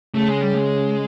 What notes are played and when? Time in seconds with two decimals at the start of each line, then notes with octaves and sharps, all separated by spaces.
0.14 C#3 A3
0.28 G#3
0.41 G3
0.54 G#3